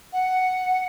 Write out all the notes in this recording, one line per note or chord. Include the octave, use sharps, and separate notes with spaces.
F#5